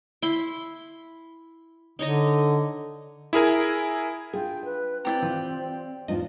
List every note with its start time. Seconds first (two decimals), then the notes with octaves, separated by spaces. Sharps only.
0.22 E4 C6
1.99 D3 D#4 C#5 D#5
3.33 E4 G#4 A#4 G#5
4.33 D4 F4 G#4 G5
4.65 B4
5.05 C4 E4 G4 D5 G5 A#5
5.23 E3 F4
6.08 E2 G#2 D4 F4 D#5